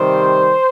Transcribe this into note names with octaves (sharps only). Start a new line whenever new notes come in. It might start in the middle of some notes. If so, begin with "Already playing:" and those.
Already playing: C3 D#3 G3 C5